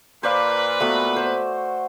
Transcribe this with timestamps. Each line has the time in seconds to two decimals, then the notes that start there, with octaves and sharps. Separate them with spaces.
0.23 A#2 B4 C5 D5 F5 B5
0.80 A3 B3 F#4
1.16 C5